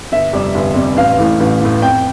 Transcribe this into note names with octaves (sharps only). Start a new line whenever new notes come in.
G1 E5
F2 C3 G3
G1
F2 C3 G3
A1 F5
A2 E3
A1
A2 E3
F2 G5